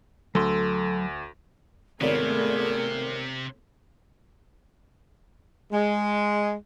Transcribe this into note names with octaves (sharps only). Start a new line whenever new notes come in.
D2 F#3 A4 C6
G#1 C3 A3 B3 G#4 A#4 C#5 D5
G#3